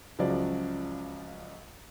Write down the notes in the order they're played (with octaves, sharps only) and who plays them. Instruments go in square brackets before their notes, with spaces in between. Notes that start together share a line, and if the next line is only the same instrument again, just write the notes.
[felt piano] C#2 C#3 F3 F#3 F#4 D5